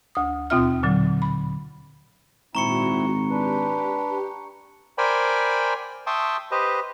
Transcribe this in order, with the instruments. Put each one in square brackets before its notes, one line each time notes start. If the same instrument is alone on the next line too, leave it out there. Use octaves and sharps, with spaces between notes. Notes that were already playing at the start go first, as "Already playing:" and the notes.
[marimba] D2 D#6
D#2 B2 C4 F4 E5 F6
A#2 D3 F#3
B5
[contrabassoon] G#1 [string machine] A#2 F#4 [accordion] C4 E4 [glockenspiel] A#5 C#6 C#7
[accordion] D4 B4 [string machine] G4
[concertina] A#4 C5 D5 G5 G#5 B5
E5 G5 A5 C6 C#6 D#6
G4 B4 C5 D#5